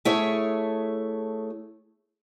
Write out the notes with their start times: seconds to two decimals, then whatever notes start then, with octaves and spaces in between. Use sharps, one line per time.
0.05 A3 E4 G#4 C#5